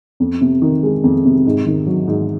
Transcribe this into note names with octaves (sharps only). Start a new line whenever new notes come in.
F2
C3
D#3
G#3
F2
C3
G#2
D#3
F#3
G#2